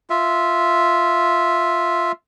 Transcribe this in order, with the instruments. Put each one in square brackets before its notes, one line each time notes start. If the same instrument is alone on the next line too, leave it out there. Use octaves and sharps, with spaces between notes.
[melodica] F4 E5